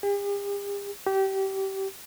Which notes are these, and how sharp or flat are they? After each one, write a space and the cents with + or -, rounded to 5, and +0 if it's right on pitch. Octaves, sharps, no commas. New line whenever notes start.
G4 +45
G4 -25